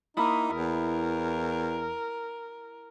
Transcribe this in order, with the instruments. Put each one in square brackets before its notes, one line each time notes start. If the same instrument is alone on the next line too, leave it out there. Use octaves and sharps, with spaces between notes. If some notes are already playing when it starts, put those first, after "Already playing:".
[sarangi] A#3 [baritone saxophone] D#4 [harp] E4 B5 D#6
[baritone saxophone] E2 [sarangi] A#4